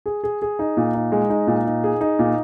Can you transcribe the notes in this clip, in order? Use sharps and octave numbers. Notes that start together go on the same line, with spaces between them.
G#4
G#4
G#4
D#4
A#2
D#4
G#3
D#4
A#2
D#4
G#4
D#4
A#2